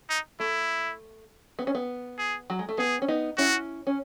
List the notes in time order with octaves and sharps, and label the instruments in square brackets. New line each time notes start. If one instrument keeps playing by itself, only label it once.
[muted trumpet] D#4
[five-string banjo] A3 [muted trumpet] E4
[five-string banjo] B3
C#4
B3
[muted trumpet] G#4
[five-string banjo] F#3
G#3
A3
[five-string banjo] B3 [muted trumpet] G#4
[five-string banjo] C#4
B3 D#4
[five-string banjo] C#4 E4 [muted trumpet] F#4
[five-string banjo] C#4